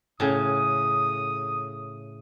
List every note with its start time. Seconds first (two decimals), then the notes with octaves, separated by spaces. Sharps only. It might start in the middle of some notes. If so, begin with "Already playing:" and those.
0.20 A2 C#3 D#6